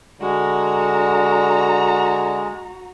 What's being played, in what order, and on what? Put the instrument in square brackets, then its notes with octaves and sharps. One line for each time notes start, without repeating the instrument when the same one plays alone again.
[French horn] D3 [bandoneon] G#3 [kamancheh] F#4 A#5